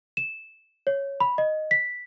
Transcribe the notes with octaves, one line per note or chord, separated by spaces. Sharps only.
E7
C#5
B5
D#5
B6